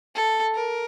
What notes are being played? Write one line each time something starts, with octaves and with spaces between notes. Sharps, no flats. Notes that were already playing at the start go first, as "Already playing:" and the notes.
A4
A#4